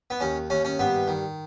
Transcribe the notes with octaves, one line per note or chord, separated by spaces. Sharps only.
B3
D#2 C#4
D#2 C#4
C#4
G2 B3
D#3